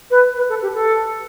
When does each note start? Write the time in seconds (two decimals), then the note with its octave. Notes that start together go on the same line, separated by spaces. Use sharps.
0.10 B4
0.36 B4
0.49 A4
0.62 G4
0.74 A4